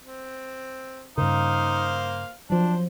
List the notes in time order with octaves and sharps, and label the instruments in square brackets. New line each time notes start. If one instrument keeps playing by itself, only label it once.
[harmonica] C4
[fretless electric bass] G2 C#3 [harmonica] A#3 C5 F5 [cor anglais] D#4 [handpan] A#4
[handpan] F3 F#3 [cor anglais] D4 [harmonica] C5